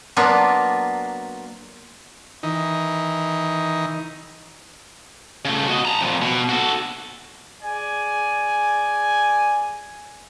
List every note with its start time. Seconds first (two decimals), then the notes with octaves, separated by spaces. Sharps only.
0.16 F#3 A#3 B3 D4 F4
2.43 D#3 E3 D#4
5.45 C#3 A3
5.67 F#4 D#5
5.85 A5 A#5
6.01 F2 A#2
6.22 B2
6.49 F#4 A4
7.63 G#4 D5 G#5